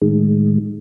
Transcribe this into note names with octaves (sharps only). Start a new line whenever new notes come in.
A2 D#3 G#3